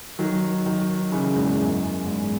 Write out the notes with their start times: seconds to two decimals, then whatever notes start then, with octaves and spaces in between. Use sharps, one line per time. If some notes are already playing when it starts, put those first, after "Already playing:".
0.19 D#3 F#3
0.66 D#3 F#3
1.12 C#3 E3
1.36 E2 G#2
1.58 F#2
2.05 E2 G#2